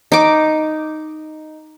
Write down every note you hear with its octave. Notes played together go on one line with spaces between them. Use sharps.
D#4 D6